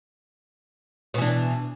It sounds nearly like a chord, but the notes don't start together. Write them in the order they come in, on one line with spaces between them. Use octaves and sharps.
B2 E3 D4